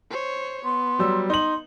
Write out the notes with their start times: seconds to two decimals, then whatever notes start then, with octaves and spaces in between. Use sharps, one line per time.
0.10 C5 C#5
0.65 B3 C6
0.99 F#3 G3 E6
1.30 D#4 C6 F#7